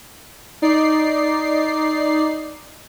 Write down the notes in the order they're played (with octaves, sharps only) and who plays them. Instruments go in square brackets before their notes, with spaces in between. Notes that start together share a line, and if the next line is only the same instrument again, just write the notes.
[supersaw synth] D#4 D5 C7